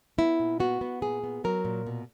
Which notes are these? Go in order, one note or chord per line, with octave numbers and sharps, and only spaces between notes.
B3 E4
A#2
B3 F#4
B3
A#2 G#4
B3
F#3 A#4
A#2
B2